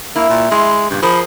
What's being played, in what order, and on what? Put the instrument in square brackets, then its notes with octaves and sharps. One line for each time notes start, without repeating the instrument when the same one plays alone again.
[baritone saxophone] A#3 [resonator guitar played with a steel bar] E4
[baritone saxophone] A#2
[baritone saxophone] G#3 [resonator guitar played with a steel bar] E4 [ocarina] C6
[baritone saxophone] G2 [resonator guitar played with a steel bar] A#2 C#3
[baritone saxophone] F3 [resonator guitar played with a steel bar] G#4 A#4 C5 [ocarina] B5